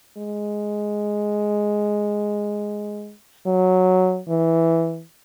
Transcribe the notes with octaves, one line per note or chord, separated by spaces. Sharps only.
G#3
F#3
E3